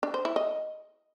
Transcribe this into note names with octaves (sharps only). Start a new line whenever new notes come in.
D4
C5
E4
D#5